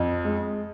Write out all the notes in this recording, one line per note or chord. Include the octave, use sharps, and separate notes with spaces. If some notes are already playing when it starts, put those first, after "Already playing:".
Already playing: F2
G#3